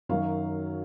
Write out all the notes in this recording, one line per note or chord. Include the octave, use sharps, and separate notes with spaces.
F#2 D#3 F#3 F5